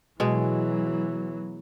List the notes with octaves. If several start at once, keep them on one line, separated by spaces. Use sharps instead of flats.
B2 E3 F#3 G#3